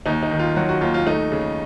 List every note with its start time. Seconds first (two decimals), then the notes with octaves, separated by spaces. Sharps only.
0.06 D#2 D#4
0.23 D#4
0.31 D#3
0.39 F4
0.56 F#3 F#4
0.69 F#4
0.81 D#2 F4
0.94 F4
1.06 A3 D#4
1.32 C#3